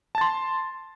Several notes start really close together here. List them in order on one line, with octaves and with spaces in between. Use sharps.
A5 A6 C6